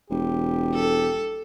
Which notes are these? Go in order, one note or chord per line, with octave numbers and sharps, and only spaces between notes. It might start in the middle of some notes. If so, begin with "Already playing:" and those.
E1 G4
A4